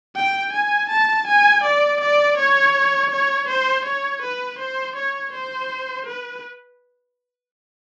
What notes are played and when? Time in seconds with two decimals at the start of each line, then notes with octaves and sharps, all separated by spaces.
0.16 G5
0.53 G#5
0.89 A5
1.27 G#5
1.64 D5
2.00 D5
2.38 C#5
3.11 C#5
3.48 C5
3.85 C#5
4.22 B4
4.59 C5
4.96 C#5
5.32 C5
6.06 B4